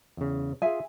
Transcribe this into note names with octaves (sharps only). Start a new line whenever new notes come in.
E2 C#3
F4 G#4 E5 G#5